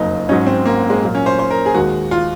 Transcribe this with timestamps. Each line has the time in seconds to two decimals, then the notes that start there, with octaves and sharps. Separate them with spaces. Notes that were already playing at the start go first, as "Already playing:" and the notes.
Already playing: F#1 F2 F#3 A#3 D#4
0.29 G#2 F#3 C#4 D#4
0.47 C4
0.66 A#3
0.90 G#3
1.02 A#2 F#3 A#3
1.15 C#4
1.26 C5
1.39 C5
1.50 A#4
1.66 G#4
1.74 D#2 D#3 G#3 F#4
2.11 F4